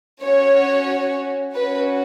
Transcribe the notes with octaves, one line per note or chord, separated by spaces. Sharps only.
C#4 F#4 C#5
C#4 F#4 B4